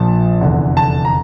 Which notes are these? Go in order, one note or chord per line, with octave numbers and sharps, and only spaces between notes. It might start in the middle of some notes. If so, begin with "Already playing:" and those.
Already playing: A#1 A#2 F3 A5
F1 E2 D3
A5
A#5